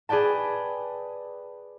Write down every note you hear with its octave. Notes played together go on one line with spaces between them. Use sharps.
G#4 B4 D5 G5 A5